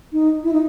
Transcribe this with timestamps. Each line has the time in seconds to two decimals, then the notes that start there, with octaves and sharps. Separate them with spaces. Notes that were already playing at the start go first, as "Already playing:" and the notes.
0.12 D#4
0.43 E4
0.52 D#4